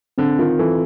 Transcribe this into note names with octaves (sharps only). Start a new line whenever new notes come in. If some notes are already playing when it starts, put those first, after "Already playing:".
D3 C4
D#3 F4
E3 A4